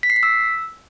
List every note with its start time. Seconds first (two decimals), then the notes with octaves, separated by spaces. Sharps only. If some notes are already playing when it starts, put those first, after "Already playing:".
0.03 B6
0.10 C7
0.16 B6
0.23 E6